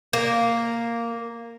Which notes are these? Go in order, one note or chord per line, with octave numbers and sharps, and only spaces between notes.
A#3